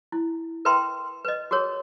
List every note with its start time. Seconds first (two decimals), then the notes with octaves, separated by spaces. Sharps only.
0.12 E4
0.65 A#4 B4 E5 G5 A#5 C6
1.25 B4 D#5
1.51 F#4 G#4 A#4 C#5